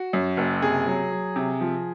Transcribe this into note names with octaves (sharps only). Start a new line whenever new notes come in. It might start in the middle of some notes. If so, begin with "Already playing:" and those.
Already playing: F#4
F#2
F#1
C3 G#4
F#3
F#3
C3
F3